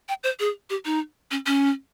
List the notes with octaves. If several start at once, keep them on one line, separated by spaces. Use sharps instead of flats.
G5
C5
G#4
G4
D#4
C#4
C#4